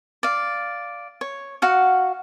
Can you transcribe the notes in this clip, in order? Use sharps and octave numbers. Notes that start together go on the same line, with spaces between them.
D5 F5
C#5
F#4 F5 F#5